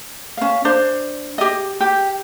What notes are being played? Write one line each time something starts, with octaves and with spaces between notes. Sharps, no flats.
C#4 F5
D4 C5
G4 D#5
G4